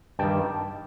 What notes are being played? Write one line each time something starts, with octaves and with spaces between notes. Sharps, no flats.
G2 D#3 G3 G5 A5